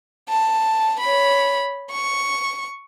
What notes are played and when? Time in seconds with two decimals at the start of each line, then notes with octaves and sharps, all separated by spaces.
0.29 A5
1.00 C#5 B5
1.92 C#6